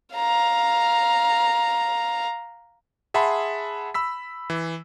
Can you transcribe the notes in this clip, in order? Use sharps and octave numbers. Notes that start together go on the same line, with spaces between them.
F5 A#5
G#4 E5 F#5 A5 B5 C6
B5 E6 B6
E3